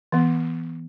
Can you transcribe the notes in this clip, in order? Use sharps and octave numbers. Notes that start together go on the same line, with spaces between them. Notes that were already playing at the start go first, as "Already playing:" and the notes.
E3 B3